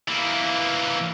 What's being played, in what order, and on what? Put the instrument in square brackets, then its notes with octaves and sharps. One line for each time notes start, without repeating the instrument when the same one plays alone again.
[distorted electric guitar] E3 A#3